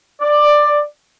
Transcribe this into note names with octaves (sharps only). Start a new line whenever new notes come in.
D5